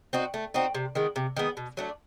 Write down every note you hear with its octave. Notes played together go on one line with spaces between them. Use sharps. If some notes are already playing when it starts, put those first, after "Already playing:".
C4 D#4 F#4
A3
C4 D#4 F#4
C3
D#3 G#3 B3
C3
D#3 G#3 B3
B2
F#3 A3 D4